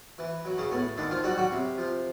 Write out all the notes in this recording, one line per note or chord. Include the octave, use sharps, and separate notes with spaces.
E3
F#3
C#3 C#4
A2 B3
D3 D#3 D4
F3 F4
F#3 G3 F#4
F#3 F#4
C3
F3